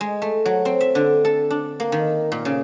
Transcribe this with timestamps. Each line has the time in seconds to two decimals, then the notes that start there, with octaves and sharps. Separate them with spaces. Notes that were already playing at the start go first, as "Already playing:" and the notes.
0.01 G#3
0.22 A3
0.45 F#3
0.65 C4
0.80 E5
0.95 D3
1.25 A4
1.50 D4
1.80 A#3
1.92 D#3
2.32 A#2
2.45 C#3